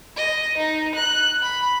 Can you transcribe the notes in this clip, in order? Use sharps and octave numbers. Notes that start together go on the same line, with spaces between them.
D#5
D#4
F#6
B5